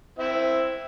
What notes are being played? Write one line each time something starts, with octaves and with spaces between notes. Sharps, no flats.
C4 E4 E5